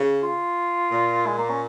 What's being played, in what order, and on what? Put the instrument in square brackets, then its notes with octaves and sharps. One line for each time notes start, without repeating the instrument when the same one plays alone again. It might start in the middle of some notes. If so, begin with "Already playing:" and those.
Already playing: [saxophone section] C#3
[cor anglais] F4
[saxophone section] A#2
[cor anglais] G#3
A#3
C#4